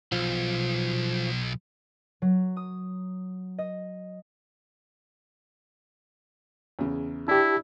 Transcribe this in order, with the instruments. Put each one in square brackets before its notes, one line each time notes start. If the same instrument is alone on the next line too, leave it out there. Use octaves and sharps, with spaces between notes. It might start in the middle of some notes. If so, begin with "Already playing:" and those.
[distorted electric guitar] B1 [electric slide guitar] F3
[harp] F#3
D#6
D#5
[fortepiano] E2 C#3
[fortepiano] D4 [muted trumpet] E4 [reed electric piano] G4 A5